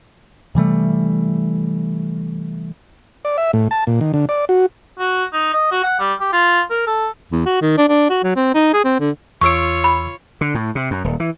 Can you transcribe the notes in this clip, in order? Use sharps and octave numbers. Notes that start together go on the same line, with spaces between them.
C3 E3 G3 A3
D5
E5
A2
A5
A#2
D#3
D3
D5
F#4
F#4
D#4
D#5
F#4
F#5
G3
G4
F4
A#4
A4
E2
F#4
D#3
D4
D4
F#4
F#3
C4
D#4
G#4
C4
D3
E2 F4 C#5 C#6 E6 D7
B5
D3
A2
C3
F#2
D#1
E3